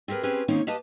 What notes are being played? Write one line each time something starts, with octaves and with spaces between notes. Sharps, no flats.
C4 G4 G#4 A#4 B4
C4 C#4 G4 G#4 B4 C5
D#3 A#3 C4 C#4 D#4 C#5
G4 B4 D#5 F5 A5